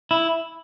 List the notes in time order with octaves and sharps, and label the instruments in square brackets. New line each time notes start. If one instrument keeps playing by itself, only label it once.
[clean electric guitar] E4